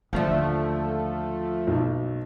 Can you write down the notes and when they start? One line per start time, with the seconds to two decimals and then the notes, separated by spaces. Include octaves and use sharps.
0.13 D#2 D3 F3 A3 F4
1.67 B1